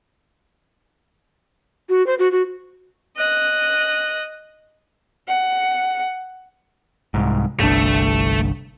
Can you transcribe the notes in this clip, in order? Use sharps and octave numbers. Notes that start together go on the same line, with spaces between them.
F#4
C5
F#4
F#4
D#5 F#6
F#5
C2 G#2
G1 C2 A3 D4